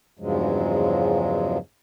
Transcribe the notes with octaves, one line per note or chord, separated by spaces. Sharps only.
E2 G2 C#3 F3 F#3 G#3